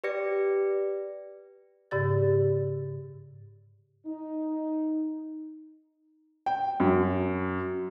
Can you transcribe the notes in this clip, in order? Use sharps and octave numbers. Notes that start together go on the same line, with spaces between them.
G4 B4 D5 A#6 C#7
G#2 C#3 G4 D5 A6
D#4
G5
F#2